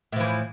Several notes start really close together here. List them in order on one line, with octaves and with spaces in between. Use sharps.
A2 F3 E3